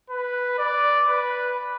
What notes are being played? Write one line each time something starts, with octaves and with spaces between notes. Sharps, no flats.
B4
D5
B4